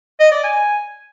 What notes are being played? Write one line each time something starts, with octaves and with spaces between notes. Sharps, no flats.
D#5
D5
G#5